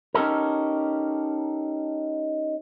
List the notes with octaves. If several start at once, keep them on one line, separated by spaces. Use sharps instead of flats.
C#4 D#4 G4 A4 A#4